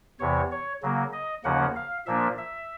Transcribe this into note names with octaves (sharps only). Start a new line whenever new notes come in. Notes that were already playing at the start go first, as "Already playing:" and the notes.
E2 C3 E3 C#5
C#5
C#3 F#3 A#3
D#5
D#2 C#3 F3 A#3 C#4 F#5
F5
A#2 F3 A#3 D4 E5
E5